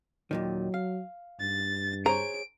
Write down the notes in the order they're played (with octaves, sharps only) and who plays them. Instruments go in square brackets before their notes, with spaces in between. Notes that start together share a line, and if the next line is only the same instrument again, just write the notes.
[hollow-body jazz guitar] D#2 A#2 D#3 [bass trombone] F#3
[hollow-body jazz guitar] F5
[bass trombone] G2 [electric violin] A6
[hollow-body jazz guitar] G#4 C5 C#5 [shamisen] A#5 [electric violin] D7